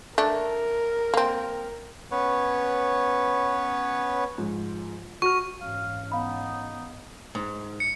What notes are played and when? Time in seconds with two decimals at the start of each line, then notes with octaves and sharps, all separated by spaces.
0.18 A3 D4 A#4
1.14 A#3 C4
2.11 B3 C#4 B4 C#5
4.38 G#2 F3
5.22 F#4 C#6 F6
5.61 G#2 E3 C#4 F5
6.12 B3 D#4 F5 B5
7.35 G#2
7.80 C#7